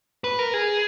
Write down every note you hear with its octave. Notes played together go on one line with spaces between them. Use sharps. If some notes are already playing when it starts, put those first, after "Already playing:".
B4
A#4
G#4